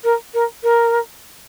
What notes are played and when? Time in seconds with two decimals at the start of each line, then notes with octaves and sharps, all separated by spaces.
0.04 A#4
0.34 A#4
0.63 A#4